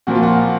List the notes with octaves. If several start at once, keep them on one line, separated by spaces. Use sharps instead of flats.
A#2 F3 A#3 F#4
F4
F#4